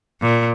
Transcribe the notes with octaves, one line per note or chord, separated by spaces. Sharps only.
A#2